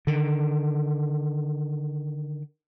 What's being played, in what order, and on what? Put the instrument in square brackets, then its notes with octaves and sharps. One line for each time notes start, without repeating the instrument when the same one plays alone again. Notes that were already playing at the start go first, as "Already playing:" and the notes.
[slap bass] D3 D#3